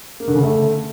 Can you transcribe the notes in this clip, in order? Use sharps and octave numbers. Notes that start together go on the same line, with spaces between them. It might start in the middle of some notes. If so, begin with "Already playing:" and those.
A#3
D3
C#3
A3